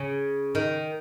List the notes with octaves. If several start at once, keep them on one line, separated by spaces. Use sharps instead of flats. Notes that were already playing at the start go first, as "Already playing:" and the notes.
Already playing: C#3
D#3